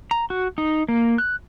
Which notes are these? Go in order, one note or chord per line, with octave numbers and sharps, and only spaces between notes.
A#5
F#4
D#4
A#3
F#6